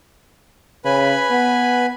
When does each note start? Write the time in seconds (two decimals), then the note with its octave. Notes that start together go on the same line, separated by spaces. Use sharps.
0.85 C#3 B4 G#5 B5
1.30 B3